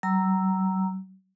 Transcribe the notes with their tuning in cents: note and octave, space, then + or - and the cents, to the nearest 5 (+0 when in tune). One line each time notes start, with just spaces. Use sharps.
F#3 +45 A#5 +0 E6 +0